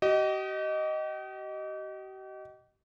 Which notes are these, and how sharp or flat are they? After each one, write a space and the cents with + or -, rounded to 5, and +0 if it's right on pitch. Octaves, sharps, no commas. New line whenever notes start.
G4 -45 D#5 +0